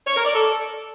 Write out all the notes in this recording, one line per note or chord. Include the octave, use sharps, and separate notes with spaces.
C#5
A#4
D5
A4